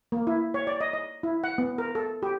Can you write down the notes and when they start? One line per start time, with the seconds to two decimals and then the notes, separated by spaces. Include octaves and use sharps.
0.12 A#3
0.27 E4
0.54 C#5
0.67 D5
0.81 D#5
0.94 D#5
1.23 E4
1.44 F#5
1.58 B3
1.78 A#4
1.95 A4
2.23 G4